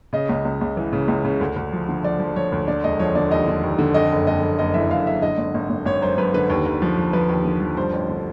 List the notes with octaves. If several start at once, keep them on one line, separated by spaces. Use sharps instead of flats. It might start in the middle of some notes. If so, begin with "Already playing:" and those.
C#3 D#5
C#2
C#2
C#2
E3
C#3
C#2
C#3
D2
D2
F3
D3
F3 D5
F3
F3 C#5
D2
D3 D5
E1 D#5
F3 C#5
D3 D5
D#2 D#5
D3
D#2
D3
F2 D#5
F#1
F2 D#5
F2
F#1 D#5
E3 E5
F#1 F5
F#1 E5
D3 D#5
G#1
G#1
G#1
G#1 C#5
F#2 C5
F#2 B4
D3 B4
D#2
D#2
F3
F3
F3 B4
D#2
D3
F3
G2 C5
A1
D3